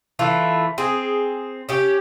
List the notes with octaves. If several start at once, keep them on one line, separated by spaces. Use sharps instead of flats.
E3 A3 F4
C4 G#4
C#4 G4